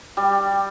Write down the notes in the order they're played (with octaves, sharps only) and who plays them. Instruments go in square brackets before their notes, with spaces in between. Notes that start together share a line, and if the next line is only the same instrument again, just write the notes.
[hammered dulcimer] G3